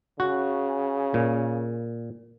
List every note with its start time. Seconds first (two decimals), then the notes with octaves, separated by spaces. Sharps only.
0.20 C#3 F#4
1.14 A#2